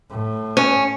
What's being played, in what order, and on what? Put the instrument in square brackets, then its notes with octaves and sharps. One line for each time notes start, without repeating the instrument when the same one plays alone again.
[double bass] A2
[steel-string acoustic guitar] C#4